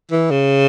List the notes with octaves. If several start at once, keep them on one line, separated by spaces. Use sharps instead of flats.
E3
C#3